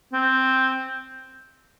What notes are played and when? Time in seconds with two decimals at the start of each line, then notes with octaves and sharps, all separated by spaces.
0.13 C4